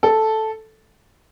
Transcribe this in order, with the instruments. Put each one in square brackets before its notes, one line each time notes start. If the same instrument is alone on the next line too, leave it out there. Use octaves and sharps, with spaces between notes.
[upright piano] A4